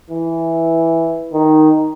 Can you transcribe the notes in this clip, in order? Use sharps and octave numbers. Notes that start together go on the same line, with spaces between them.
E3
D#3